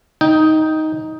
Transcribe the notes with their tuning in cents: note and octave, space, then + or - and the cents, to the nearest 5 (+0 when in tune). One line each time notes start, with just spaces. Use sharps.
D#4 +10 G5 +0